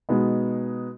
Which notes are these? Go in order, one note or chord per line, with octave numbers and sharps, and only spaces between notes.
B2 G#3 B3 D#4